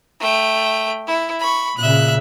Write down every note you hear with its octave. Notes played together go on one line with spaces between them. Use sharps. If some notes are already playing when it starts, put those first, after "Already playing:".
A3 G5
E4
B5 C#6
A#2 C#3 E5 F#6